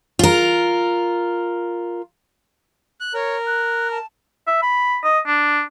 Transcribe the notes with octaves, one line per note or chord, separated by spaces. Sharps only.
F4 A#4
F#6
A#4 C#5
F#6
A5
E5
B5
D#5
D4